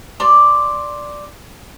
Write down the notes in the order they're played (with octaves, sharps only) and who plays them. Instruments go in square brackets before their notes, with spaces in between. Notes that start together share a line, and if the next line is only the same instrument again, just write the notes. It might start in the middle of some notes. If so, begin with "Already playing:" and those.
[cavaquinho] D5 C6